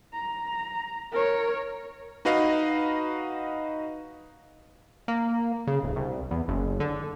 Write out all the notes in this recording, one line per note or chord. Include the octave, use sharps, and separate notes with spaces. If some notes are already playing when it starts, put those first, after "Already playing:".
A#5
A#4 C#5
D#4 F#4 B4 D#5 F5
A#3
C#3
D1
C2
E2
F#1
D3